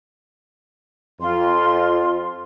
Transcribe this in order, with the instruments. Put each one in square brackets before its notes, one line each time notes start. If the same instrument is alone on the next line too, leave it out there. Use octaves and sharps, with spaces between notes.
[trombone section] F2 [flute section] F4 C6